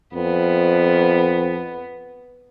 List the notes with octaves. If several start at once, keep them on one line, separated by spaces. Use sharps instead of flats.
F2 B3